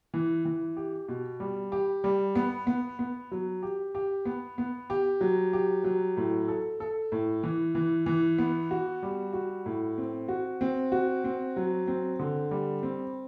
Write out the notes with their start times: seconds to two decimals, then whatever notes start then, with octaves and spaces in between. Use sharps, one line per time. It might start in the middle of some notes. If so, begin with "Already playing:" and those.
0.14 E3
0.45 E3
0.77 G4
1.08 B2
1.40 G3
1.72 G4
2.04 G3
2.35 B3
2.67 B3
2.99 B3
3.31 F#3
3.63 G4
3.95 G4
4.25 B3
4.58 B3
4.90 G4
5.21 F#3
5.53 G4
5.84 F#3
6.17 A2
6.48 A4
6.80 A4
7.12 A2
7.43 E3
7.75 E3
8.06 E3
8.38 B3
8.71 F#4
9.03 G3
9.33 F#4
9.66 A2
9.98 C4
10.28 F#4
10.61 C4
10.92 F#4
11.24 C4
11.56 F#3
11.87 C4
12.19 D3
12.51 G3
12.83 C4